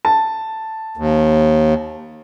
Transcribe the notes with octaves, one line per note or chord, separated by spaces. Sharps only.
A5
D#2